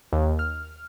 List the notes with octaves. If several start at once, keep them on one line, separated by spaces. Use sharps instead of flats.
D#2
F6